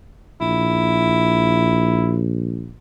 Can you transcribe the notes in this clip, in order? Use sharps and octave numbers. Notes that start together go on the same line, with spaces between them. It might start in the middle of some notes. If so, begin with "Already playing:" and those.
A#1 E4